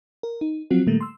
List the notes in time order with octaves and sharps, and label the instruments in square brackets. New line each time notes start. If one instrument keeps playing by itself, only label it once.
[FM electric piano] A#4
D#4
F3 F#3 C4 F4 F#4
A#2 D#3 G3 A3 A#3
C6 E6